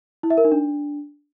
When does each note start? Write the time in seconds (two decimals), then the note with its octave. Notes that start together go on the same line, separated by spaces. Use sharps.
0.23 E4
0.30 E5
0.38 A#4
0.45 D#4
0.52 D4